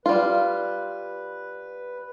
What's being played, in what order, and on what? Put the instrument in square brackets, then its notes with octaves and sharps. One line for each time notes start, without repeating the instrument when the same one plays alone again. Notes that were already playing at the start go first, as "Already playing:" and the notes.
[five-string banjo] G3 F4 [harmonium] B4